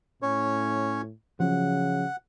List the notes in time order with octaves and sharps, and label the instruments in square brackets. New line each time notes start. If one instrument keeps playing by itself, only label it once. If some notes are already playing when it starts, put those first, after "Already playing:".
[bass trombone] A2 [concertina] C#4 C#5
[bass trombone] C#3 [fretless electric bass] F3 F#3 C#4 [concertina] F#5